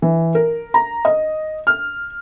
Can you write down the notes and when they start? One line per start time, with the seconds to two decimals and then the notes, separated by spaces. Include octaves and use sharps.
0.02 E3
0.35 A#4
0.74 A#5
1.05 D#5
1.67 F6